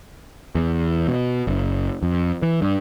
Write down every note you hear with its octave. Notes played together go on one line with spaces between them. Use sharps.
E2
B2
F#1
F2
E3
G2